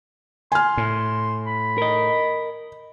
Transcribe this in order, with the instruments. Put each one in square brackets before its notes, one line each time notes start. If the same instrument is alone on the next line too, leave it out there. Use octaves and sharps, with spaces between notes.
[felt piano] G#5 F6 [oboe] C6
[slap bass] A2
[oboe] B5
[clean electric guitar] A#4 D#5